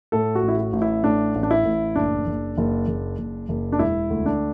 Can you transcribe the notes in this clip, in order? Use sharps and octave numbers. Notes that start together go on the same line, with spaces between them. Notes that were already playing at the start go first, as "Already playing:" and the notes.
A2 A4
F#4
A1
E4
F#4
A1
E4
A2 D4
A1
D4
E4
A1
F#1 D4
F#1
F#1
F#1
F#1
F#1
D4
E1 E4
D2
D4